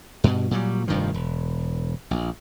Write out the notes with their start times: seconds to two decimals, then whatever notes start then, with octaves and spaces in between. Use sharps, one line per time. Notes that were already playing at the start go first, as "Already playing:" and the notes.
0.24 G2 B2
0.51 A#2 F#3 G3
0.88 F1 G2 D#3 F3
1.14 E1
2.11 A#1